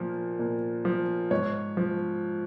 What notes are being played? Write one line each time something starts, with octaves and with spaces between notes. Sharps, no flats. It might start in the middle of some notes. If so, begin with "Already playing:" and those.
Already playing: A#2 F3
A#2
F3
G#2 C#5
F3